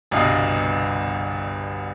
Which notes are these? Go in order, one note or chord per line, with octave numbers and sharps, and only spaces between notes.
G1 C2 B2 D4 D#5 F5